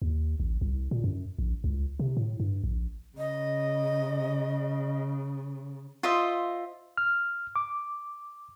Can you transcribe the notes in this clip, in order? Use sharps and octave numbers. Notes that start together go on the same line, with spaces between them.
D#2
A1
C2
A#2
F#2
A#1
C#2
C3
A2
G2
A#1
C#3 D#5
F4 C5 D#5 E5
F6
D6